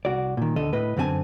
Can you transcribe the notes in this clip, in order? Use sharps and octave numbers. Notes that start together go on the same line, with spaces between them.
C2 F#4 D5
A#2 D#3
D2 D3 A4 D#5
A2 B4 D#5
F#2 D3 C4 E4 G#5 A5